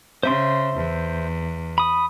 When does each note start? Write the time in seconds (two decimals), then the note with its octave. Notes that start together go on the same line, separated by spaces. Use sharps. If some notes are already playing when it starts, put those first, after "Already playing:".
0.23 C#3 C5 E5 C6
0.76 E2
1.78 B5 D#6